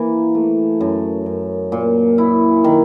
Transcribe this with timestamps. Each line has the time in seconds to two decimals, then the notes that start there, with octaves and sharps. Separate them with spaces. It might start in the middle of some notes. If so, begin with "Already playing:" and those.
Already playing: E3 A#3
0.35 A3
0.81 F#2
1.26 F#2
1.72 A#2
2.18 E4
2.64 D#3